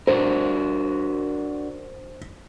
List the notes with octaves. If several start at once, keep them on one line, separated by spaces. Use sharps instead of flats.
D4 F#4 A#4 C5